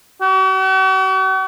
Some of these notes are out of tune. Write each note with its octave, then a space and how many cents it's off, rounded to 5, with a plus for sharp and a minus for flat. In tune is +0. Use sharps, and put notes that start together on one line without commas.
F#4 +45